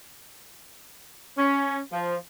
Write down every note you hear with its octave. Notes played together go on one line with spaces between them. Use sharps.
C#4
F3